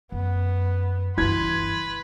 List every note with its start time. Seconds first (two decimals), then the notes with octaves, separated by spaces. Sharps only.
0.12 F#2 B3
1.17 F#1 G2 E3 B4 C6 G#6